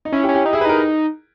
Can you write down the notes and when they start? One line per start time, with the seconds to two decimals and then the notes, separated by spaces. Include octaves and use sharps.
0.05 D#4
0.12 C#4 E4
0.24 G4
0.29 C#4
0.35 G4
0.46 D#4
0.53 E4 G#4
0.61 B4
0.65 D#4 A#4